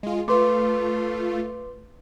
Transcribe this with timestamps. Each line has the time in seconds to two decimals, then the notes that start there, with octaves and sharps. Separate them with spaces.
0.03 G#3 F4
0.28 A3 F4 B4 C6 D6